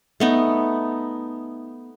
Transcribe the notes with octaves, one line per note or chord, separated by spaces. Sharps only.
A3 B3 D#4